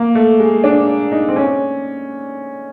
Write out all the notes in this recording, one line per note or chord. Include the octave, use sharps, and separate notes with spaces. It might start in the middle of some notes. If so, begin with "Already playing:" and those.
Already playing: A#3
A3
G#3
D4
D#4
C4
C#4